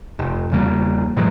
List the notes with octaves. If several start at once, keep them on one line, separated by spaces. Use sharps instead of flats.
F1
E2 C#3 G3 A#3
A2 E3 F#3 G#3